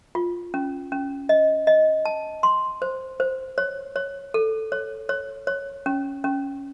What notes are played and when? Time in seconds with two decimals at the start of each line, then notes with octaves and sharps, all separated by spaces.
0.15 F4
0.54 C#4
0.92 C#4
1.29 D#5
1.67 D#5
2.05 A5
2.43 C6
2.82 C5
3.20 C5
3.58 C#5
3.96 C#5
4.34 A4
4.72 C#5
5.09 C#5
5.47 C#5
5.86 C#4
6.24 C#4